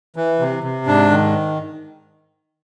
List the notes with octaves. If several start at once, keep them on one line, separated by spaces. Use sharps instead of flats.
E3
C3
C3
G#2 D4
D#3